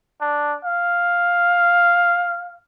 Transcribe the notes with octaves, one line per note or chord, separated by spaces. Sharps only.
D4
F5